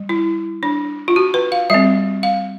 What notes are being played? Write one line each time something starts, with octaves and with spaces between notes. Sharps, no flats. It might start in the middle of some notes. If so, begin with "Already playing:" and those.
Already playing: G3
E4
D4
F4
F#4
B4
F5
G3 C4 E5
F5